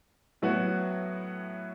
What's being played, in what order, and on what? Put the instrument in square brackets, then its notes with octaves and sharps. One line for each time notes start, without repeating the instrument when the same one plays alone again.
[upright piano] A2 F#3 B3 F#4